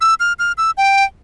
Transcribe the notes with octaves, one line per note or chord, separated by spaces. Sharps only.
E6
F6
F6
E6
G5